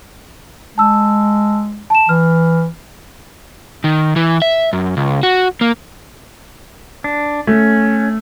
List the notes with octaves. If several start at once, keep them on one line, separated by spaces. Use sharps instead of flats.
G#3 A5 E6
A5 E7
E3 F6
D#3
E3
E5
F#2
C#2
F#4
A#3
D4
A3 C#4